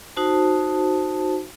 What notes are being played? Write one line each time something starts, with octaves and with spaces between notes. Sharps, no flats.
D#4 F#4 C5 A5